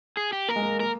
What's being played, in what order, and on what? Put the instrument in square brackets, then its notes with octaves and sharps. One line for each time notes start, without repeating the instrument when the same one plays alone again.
[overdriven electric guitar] G#4
G4
[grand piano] A#3 [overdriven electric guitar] A#4
[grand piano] G#3
A#3
[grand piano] A#3 [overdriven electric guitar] A#4